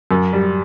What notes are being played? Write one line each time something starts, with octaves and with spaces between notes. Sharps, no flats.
F#2
G3